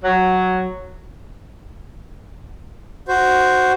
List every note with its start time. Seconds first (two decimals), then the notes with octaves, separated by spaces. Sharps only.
0.04 F#3
3.08 F#4 C5